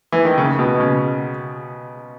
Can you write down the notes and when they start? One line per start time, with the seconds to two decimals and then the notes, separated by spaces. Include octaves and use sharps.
0.12 E3
0.25 D#3
0.38 C#3
0.59 B2
0.80 C#3